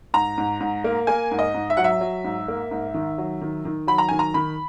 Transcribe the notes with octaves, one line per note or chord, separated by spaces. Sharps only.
G#2 A#5
G#2
G#2
A#3
A#3 G#5
G#2
D#5
G#2
E5
F#3 F#5
E5
F#3
G#2
A#3
G#2
D#3
F#3
D#3
D#3
F#3 B5
A#5
D#3 G#5
A#5
D#3 B5